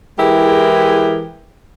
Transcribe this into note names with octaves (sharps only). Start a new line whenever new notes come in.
E3 G#3 E4 G4 G#4 A#4